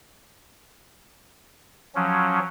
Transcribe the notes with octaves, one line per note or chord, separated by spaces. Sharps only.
F3 F#3 C#4